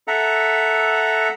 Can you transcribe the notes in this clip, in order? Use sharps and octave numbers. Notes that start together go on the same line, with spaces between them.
A4 E5 F#5 A#5